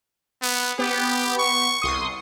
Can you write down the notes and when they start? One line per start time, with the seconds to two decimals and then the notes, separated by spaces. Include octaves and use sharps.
0.42 B3
0.79 B3 G4
1.38 C#6
1.82 C2 C6 D#6